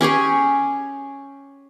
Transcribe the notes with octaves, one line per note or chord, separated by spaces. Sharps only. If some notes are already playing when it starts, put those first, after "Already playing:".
C#4 G4 G#4 C#5